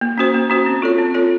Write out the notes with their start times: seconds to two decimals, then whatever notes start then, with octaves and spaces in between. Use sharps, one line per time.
0.01 A#3
0.18 C#4 F#4 C5
0.34 A#3
0.50 C#4 F#4 C5
0.66 C4
0.82 F4 A4 C#5
0.98 C4
1.14 F4 A4 C#5